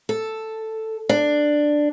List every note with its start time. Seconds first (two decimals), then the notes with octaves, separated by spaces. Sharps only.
0.09 A4
1.09 D4